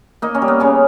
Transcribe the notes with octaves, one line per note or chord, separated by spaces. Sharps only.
A#3 D#4
C#4
G3
B3
C#3 C#4